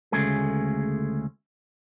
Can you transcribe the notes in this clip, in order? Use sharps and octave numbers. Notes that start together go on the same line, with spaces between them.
D2 C#3 G#3 A3 G#4